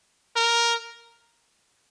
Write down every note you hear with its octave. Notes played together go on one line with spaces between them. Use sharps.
A#4